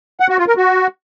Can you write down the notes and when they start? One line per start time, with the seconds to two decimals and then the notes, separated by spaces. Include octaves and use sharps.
0.20 F#5
0.29 F#4
0.38 F4
0.48 A#4
0.57 F#4